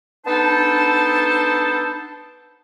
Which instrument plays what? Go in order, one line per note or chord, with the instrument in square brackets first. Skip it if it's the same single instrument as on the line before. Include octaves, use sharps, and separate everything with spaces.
[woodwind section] B3 D4 D#4 A4 C5 A5